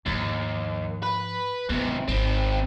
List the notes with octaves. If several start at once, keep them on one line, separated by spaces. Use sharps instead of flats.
D#2 G#2 F3
B4
G#2 C3 B3
G#1 D#3 C4